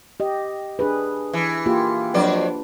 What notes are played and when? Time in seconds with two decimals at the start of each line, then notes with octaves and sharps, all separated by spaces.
0.20 G4 D#5
0.79 D4 G#4 B4
1.33 E3
1.66 A#3 F4 G4
2.14 F2 F#3 D4 B4 D5